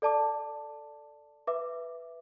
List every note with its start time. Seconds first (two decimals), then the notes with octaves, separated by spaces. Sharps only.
0.02 A4 D5 A5 D6
1.47 B4 E5 D6